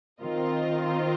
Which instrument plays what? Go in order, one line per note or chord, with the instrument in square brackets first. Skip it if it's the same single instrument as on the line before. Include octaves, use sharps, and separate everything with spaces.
[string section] D#3 C4 F4 A#4 D#5